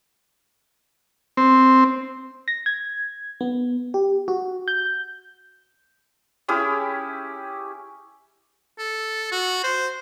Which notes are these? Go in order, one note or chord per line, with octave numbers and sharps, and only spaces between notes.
C4
A#6
G#6
B3
G4
F#4
G6
C#4 E4 G4 G#4
A4
F#4
C5